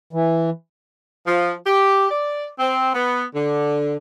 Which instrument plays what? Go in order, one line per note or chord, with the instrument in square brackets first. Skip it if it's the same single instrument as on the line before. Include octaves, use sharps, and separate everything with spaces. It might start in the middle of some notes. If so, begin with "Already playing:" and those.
[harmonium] E3
[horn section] F3
G4
D5
C4
B3
D3